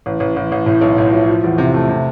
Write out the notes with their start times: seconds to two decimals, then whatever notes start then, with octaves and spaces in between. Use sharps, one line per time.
0.06 A1
0.20 A1
0.36 A1
0.52 A1
0.66 A2
0.81 B1
0.98 A2
1.13 F3
1.28 F3
1.44 E2
1.58 C3
1.74 A3
1.89 C3